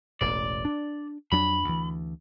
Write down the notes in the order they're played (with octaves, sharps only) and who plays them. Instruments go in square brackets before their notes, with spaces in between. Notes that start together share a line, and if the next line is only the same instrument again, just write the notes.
[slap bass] E1 A1 [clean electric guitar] D5
[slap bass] D4
[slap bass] F2 F#3 D4 [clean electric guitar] B5
[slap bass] D2 E3